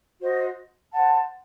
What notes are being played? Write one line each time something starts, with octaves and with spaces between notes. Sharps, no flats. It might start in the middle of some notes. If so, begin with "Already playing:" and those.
F#4 C5 D#5
C5 F#5 A5